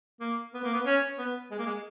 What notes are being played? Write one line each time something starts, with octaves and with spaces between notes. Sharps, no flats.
A#3
B3
A#3
B3
C#4
B3
G#3
A#3
G#3